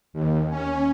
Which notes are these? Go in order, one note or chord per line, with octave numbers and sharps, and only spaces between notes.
D#2
C#4